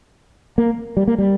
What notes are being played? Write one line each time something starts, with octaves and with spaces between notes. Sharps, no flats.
A#3
G3
A#3
G3